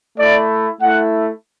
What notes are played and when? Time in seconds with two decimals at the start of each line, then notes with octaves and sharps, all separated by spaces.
0.17 A3 E4 D5
0.81 A3 E4 F#5